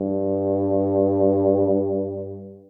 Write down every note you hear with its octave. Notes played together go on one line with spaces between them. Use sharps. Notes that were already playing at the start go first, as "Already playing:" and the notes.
Already playing: G2